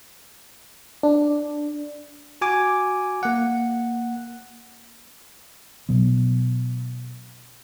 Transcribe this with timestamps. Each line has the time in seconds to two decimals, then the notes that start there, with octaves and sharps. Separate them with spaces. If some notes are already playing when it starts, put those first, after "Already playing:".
1.03 D4
2.41 F#4 G#5 D6
3.23 A#3 F#5
5.89 B2 F#3 B3